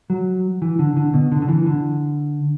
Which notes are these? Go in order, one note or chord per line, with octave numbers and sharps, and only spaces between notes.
F#3
E3
D3
D3
B2
D3
D3
E3
D3